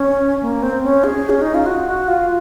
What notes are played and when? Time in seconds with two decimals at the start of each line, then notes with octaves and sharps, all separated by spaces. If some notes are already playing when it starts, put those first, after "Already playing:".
Already playing: C#4
0.42 A#3
0.63 C4
0.83 C#4
1.04 G#4
1.30 C#4
1.42 D#4
1.54 F4
1.66 F#4
1.87 F#4
2.08 F4